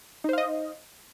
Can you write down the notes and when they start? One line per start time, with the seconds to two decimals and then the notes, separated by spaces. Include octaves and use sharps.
0.24 D#4
0.29 C5
0.33 F5
0.38 D#5